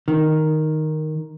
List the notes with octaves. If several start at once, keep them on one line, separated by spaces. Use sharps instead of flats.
D#3